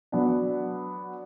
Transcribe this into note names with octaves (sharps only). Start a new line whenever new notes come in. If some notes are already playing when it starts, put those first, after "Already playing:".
F#3 B3 D4